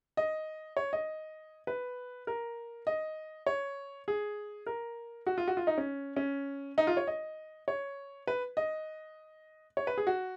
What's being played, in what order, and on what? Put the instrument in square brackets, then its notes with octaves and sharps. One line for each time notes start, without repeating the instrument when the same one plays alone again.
[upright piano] D#5
C#5
D#5
B4
A#4
D#5
C#5
G#4
A#4
F#4
F4
F#4
F4
D#4
C#4
C#4
D#4
F4
C#5
D#5
C#5
B4
D#5
C#5
B4
G#4
F#4